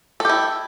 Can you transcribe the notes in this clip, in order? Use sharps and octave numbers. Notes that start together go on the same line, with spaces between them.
E4 G4 A4